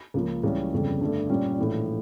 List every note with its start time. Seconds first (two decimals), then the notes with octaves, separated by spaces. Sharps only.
0.14 C#2 C#3 F3 A#3
0.44 C#2 C#3 E3 G3 C#4
0.72 G1 F2 C#3 G3
1.01 G2 D3 A3
1.29 A#2 G3 C#4
1.58 A#1 A2 E3